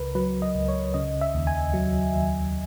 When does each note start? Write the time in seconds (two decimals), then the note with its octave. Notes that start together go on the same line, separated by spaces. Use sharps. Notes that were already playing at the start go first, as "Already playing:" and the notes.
Already playing: C#2 C#3 A#4 B4
0.15 F#3 B4
0.42 D#5
0.55 C#2
0.69 C#5
0.94 C#3 D#5
1.21 E5
1.34 D#2
1.47 G#5
1.74 F#3
2.14 D#2